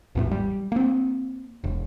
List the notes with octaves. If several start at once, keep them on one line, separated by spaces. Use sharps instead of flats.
G#1 E2 A2
G3
A#3 C4
E1